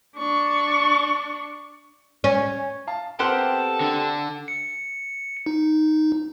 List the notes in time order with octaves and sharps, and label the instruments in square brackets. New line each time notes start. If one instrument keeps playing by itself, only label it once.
[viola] D4 C#6
[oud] C#4
[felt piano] F5 A5
[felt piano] B3 C4 A#4 [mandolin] G4 C5 F#5 [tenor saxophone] A4
[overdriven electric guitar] D3
[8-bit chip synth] C#7
D#4